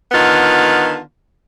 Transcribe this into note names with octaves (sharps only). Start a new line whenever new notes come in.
D3 D#3 B3 F4